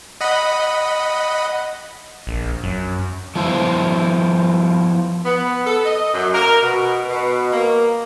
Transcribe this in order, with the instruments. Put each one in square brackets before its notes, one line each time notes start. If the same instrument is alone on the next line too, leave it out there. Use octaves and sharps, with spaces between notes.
[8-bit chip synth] D#5 F#5 B5
[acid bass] A#1
F#2
[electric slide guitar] F3 B3 E4 C5
[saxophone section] B3
A4
D#5
F#2
A#4
B2
B2
A#3